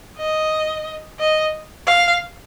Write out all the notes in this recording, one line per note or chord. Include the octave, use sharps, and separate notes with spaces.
D#5
D#5
F5